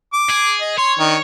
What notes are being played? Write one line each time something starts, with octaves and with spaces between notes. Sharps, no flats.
D6
G#4
D#5
C#5 C6
D#3 D4